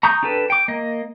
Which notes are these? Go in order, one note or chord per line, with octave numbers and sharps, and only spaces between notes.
A#5 C#6 D#6 G6
D4 G4 A4 B4
G5 D6
A#3 D#5